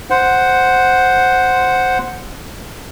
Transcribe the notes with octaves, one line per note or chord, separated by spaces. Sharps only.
C5 F#5